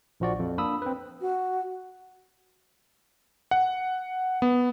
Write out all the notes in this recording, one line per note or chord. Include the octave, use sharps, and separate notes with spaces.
A#1 F3 F#4 D5
F2
A#3 D4 B5 D#6 E6
C4 B4
F#4
F#5
B3